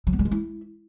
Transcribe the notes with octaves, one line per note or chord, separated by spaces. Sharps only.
F#3
B3
G3
G#3
E4